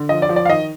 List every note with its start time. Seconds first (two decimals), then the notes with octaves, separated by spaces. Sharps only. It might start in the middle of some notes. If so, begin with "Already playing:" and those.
Already playing: D3
0.09 F3 D#5
0.22 D5
0.29 F3
0.36 D5
0.45 F5
0.49 D#3 D#5